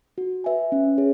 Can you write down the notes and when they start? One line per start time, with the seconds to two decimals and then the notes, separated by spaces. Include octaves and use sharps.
0.18 F#4
0.44 B4 E5 G#5
0.72 C#4
0.98 G#4 C#5